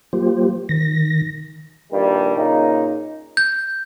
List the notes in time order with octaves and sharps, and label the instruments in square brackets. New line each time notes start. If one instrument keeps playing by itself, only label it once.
[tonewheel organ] F#3 A#3 F4 G4 C5
D#3 A#6
[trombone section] A#1 G2 D#3 G3
A#2 C#3 D#4
[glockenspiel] G6